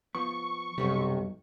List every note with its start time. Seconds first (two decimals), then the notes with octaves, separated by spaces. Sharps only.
0.15 F3 B3 C#6
0.78 B1 F#2 C3 G3